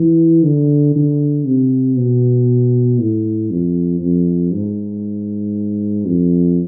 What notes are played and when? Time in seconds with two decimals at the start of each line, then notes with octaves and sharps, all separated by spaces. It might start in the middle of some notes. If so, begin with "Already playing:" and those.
Already playing: E3
0.44 D3
0.96 D3
1.46 C3
1.97 B2
2.99 A2
3.51 F2
4.01 F2
4.52 G#2
6.06 F2